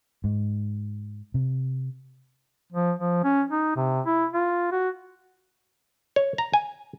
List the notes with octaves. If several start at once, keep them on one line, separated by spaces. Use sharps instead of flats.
G#2
C3
F3
F3
C#4
D#4
C3
E4
F4
F#4
C#5
A#5
G#5